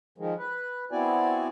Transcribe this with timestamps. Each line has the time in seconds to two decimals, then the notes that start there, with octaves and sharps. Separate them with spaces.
0.18 D#3 F3 G#3
0.38 B4
0.92 B3 C4 E4 F#4 D5 G#5